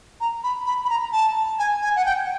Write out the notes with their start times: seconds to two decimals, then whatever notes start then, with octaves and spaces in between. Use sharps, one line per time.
0.21 A#5
0.44 B5
0.67 B5
0.85 B5
0.90 A#5
1.13 A5
1.59 G#5
1.82 G#5
1.96 F#5
2.05 G5